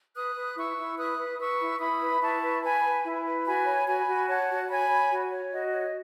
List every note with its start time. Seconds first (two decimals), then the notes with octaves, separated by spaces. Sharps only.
0.15 B4 D#6 F#6
0.36 B4
0.56 E4 C#6 E6
0.77 E4
0.97 B4 D#6 F#6
1.18 B4
1.38 B4 C#6 E6
1.60 E4
1.80 E4 B5 D#6
2.01 B4
2.21 E4 A5 C#6
2.43 B4
2.62 B4 G#5 B5
2.84 B4
3.04 E4
3.25 B4
3.46 F#4 G#5 B5
3.66 C#5
3.87 F#4 G#5 B5
4.07 F#4
4.28 C#5 F#5 A5
4.49 F#4
4.69 C#5 G#5 B5
4.91 C#5
5.11 F#4
5.32 C#5
5.52 F#4 D#5
5.72 C#5